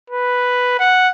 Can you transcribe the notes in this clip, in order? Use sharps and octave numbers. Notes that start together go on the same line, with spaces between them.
B4
F#5